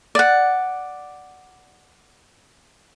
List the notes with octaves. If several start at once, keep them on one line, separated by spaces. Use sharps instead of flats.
D5 F#5